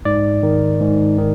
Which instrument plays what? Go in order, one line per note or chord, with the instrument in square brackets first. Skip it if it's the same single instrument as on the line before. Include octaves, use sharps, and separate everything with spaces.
[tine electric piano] G#2 D5
D#3
G#2
D#3